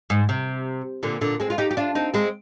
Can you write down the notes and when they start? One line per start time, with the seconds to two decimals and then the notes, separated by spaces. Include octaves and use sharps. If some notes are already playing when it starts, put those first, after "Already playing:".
0.10 G#2
0.29 C3
1.03 A#2 D3
1.21 A#2 D3
1.40 G#3 C4
1.50 F4
1.58 D#4 G4
1.71 G4
1.77 D4 F4
1.95 C4 D#4
2.14 G#3 C4